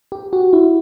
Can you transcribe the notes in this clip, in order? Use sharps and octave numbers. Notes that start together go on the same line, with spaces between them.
G4
F#4
E4